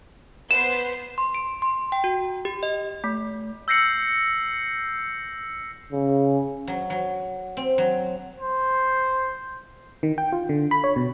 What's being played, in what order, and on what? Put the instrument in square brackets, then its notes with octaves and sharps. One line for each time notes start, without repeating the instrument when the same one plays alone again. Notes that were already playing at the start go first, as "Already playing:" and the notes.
[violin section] B3 C5 C7 [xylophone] E7
[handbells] C6
D7
C6
G5
F#4
G4
D#5
A3
[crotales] E6 G6 A#6 C7 C#7 F#7
[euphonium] C#3
[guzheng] F#3
F#3
C4
F#3
[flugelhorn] C5
[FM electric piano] D#3
G5
F4
D3
B5
C#5
B2